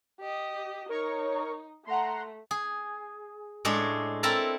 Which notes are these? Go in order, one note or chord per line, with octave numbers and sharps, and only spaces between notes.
G4 D#5
D#4 A#4 C#5 C#6
A3 F#5 A#5 C6
G#4
A2 G#3 D4 C#5
C4 E4 A4 A#4 A5 A#5